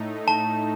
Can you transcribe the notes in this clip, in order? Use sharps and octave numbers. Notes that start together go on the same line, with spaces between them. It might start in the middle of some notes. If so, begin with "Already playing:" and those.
Already playing: A2 A3 D#4
A5